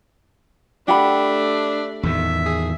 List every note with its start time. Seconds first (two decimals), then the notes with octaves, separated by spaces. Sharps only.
0.88 A3 D4 G4 E5 F#5 B5
2.03 E2 A2 D#3 E5
2.46 G#4